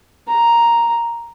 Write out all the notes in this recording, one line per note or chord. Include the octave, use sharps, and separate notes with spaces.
A#5